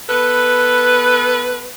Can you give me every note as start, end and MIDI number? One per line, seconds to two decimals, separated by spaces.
0.09 1.71 59
0.09 1.71 69
0.09 1.71 71